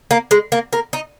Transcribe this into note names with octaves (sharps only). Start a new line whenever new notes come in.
A#3
G#3
A#3
A#3
D#4